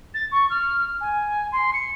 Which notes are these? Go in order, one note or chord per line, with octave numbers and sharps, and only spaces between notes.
A6
C#6
F6
G#5
C6
C#7